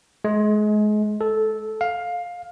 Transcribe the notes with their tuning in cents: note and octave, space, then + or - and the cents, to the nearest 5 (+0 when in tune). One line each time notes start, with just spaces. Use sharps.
G#3 +30
A4 -10
F5 +15